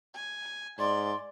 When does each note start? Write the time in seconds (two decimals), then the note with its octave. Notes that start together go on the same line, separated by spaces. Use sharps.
0.15 G#5
0.79 G#2 D5 C6